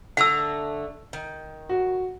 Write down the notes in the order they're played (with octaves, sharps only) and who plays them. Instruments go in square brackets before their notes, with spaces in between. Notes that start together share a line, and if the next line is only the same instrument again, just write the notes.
[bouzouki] D3 A3 A#5 [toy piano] F#5 E6
[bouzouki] D#3
[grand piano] F#4